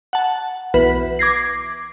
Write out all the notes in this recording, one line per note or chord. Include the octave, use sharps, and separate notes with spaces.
F#5 A5
B1 E3 B4
D6 G#6 A#6 C7